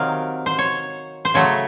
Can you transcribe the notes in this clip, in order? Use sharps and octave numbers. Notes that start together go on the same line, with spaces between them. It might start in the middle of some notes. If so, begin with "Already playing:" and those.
Already playing: C3 D#3 F#3 F5
C5
C#5
C5
C#3 F#3 A3 C#5